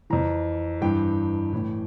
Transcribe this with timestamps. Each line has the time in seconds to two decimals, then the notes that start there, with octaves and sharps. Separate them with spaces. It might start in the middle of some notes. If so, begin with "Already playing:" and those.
0.10 F2 E3 A#5
0.81 G2 E3 G5
1.53 A2 E3